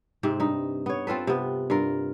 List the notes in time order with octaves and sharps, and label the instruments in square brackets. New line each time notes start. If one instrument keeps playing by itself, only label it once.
[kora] G#2 C3 C4
G2 D#4
B3 C#5
C4 F4 A4 B4
C3 B3
G2 F4 A#4